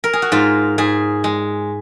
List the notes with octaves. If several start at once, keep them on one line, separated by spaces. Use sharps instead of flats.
A#4
G#4
F#4
G#2 F4
G#2 G#4
G#3